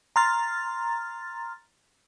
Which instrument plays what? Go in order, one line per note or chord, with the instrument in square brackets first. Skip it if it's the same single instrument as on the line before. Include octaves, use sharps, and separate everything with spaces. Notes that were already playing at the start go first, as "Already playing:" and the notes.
[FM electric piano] A#5 C6 F6 A6